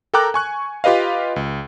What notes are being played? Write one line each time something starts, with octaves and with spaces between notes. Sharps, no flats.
A4 A#4 G5 A#5 D6 F#6
G#5 C#6 F#6
F4 G4 B4 D#5 F5
C#2